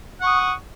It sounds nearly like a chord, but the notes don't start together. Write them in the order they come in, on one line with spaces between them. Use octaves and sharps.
F#5 C#6 D#6